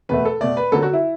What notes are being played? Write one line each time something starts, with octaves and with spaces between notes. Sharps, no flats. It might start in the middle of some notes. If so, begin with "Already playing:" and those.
E2 B2 A3 B4
A4
B2 A3 D5
B4
F#2 D3 F#3 A4
F#4
E4